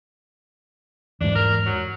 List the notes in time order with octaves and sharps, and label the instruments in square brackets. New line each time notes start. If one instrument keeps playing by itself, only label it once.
[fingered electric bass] E2 G#2 [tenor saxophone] D4
[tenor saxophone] A#4
F#3